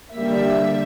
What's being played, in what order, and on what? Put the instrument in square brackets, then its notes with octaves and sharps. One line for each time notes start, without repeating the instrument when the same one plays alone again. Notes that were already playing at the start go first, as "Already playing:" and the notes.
[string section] D3 G3 A#3 E5